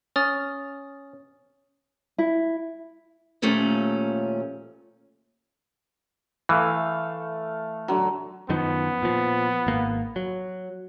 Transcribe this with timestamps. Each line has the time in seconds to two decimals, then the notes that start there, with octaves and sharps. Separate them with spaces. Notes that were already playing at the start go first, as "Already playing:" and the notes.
0.16 C#4 D#6 F6 A6
2.18 E4
3.42 D#2 A#2 F3 A3 C#4
6.49 E3 A3 F5
7.88 D3 F#3
8.49 F#2 D#3 F3 B3
9.02 A#2 F3
9.67 G#1 A#3
10.16 F#3